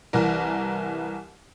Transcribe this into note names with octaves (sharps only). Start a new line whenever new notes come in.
C2 E3 A#4